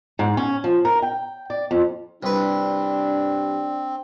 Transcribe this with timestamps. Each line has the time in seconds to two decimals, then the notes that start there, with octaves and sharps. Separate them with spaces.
0.19 G#2
0.37 C#4
0.64 F3
0.85 A#4
1.02 G5
1.50 D5
1.71 F2
2.23 C2 C4 D4 B4